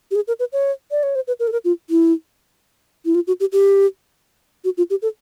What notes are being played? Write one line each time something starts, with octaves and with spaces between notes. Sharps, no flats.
G4
G#4
A#4
B4
C#5
D5
C#5
C5
B4
A#4
A4
A#4
F4
E4
E4
F4
F#4
G4
G4
F#4
F4
G4
A4